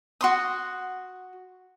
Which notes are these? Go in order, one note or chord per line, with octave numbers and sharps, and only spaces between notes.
F#4 C6 D#6